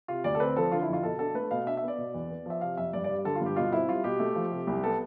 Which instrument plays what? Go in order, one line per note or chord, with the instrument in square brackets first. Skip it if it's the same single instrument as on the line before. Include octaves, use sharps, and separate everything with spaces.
[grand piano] C3 F4
D2 D5
A4
C4 B4
F3 A4
D3 F4
E4
F2
F4
B2 A4
D4 A4
A3 B4
B2 F5
D4 E5
E5
B3
D5
B2
E2
B3
F3 E5
C3 F5
F2 E5
G2 D5
G3 D5
D3 A4
F4
G2 G4
B2 F4
C4 E4
G3 F4
B2 G4
A3
F3
C3
C2
B3 A4